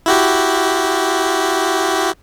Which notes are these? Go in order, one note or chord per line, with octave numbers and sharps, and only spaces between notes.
E4 F#4 G4